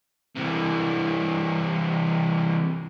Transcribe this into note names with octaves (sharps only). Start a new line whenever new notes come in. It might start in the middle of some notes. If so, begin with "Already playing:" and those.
C3 E3